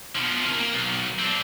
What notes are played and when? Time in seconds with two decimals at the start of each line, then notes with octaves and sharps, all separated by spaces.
0.15 B2 F3
0.43 C3 A#4
0.58 A#3
0.73 B1
1.19 C4 D4